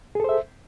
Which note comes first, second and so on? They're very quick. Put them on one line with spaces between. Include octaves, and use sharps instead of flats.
G#4 A4 C5 E5